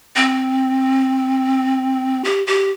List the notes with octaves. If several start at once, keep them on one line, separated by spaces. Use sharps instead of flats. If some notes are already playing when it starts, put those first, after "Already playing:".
C4
G4
G4